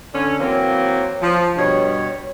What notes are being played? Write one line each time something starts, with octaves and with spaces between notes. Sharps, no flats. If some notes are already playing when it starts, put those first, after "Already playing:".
D3 C#4
E3 F#3 A#3 C4
F3
G2 B2 G3 C#5